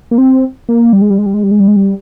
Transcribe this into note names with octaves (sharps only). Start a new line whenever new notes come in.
A#3
C4
A#3
G3
G#3
G3
G#3
G3
G#3
G3
G#3
G3
G#3
G3